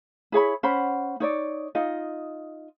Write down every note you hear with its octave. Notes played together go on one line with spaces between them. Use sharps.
E4 G#4 C#5 B5
C#4 C5 F#5 B5
D#4 C#5 D5
D#4 F4 D#5